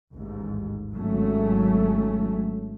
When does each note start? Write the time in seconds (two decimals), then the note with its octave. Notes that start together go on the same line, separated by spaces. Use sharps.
0.14 A1 D#2 G#2
0.93 G#1 F#3 A3 C#4